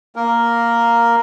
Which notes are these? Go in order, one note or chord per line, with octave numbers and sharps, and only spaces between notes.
A#3 A#4